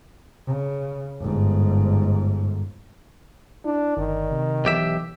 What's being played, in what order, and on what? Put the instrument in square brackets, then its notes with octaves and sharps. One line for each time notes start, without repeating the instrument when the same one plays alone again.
[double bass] C#3
G1 G#2
[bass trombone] D4 [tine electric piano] E4
[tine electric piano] G1 D5 [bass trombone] D#3
[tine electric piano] C3
[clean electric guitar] B1 G4 E5 [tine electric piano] E3